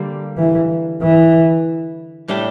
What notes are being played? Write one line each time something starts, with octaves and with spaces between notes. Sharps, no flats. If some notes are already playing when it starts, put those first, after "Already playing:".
Already playing: D3 G3 A#3
E3
E3
A2 G3 D4 G4